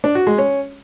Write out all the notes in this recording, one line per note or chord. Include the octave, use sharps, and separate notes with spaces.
D4
F#4
G#3
C#4